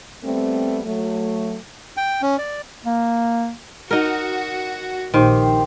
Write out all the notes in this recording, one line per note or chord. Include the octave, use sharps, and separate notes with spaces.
G3 A3 B3 C4
F#3 A3
G5
C#4
D5
A#3
D#4 F#4 A#4
A#1 D#3 G4 C5